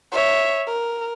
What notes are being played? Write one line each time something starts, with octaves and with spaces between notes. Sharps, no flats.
C#5 E5
A#4